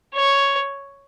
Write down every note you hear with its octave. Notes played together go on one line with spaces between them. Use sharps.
C#5